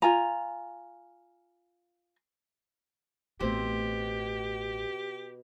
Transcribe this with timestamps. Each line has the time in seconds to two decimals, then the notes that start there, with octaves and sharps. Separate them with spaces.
0.02 F4 G#5 A#5
3.40 A1 B2 A3 C4 G4 B5